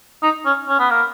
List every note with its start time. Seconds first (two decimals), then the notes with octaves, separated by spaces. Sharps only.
0.23 D#4
0.45 C#4
0.68 C#4
0.79 B3
0.90 A#3